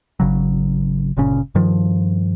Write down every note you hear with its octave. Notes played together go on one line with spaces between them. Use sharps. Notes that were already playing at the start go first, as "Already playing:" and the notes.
G#1 C#3 F#3
G1 A#2 C#3 C#4
G2 D#3 F3